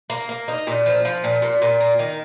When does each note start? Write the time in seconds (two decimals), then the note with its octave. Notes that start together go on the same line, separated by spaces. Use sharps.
0.10 A#3
0.29 A#3
0.48 D#4
0.67 A#2
0.86 F3
1.05 F3
1.24 A#2
1.42 A#2
1.62 A#2
1.80 A#3
1.99 D#3